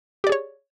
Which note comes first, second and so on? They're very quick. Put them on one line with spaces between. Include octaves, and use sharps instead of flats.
G4 D5 G#4 C#5